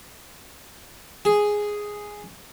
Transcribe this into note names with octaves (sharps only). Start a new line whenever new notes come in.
G#4